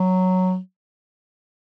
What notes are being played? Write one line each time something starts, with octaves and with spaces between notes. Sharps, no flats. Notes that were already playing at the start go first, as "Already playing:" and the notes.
Already playing: F#3